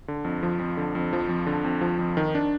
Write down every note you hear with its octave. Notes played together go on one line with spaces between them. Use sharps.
D3
F2
F3
F2
D3
F2
F3
F2
D3
F2
F3
F2
D#3
D4